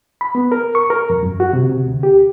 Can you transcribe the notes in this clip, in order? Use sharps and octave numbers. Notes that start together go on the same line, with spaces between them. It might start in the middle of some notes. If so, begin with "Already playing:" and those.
B5
B3
A#4
C#6
A#4
F2
F#2
F#4
C3
C3
D2
G4